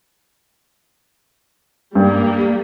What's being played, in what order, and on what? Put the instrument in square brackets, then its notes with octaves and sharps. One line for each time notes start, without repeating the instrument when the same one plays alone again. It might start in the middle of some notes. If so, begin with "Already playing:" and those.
[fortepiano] G2 [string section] G3 A#3